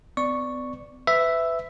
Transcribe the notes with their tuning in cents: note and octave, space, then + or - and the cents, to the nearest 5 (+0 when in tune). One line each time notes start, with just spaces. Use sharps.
B3 +45 D5 +0 C#6 +0
B4 +30 E5 +0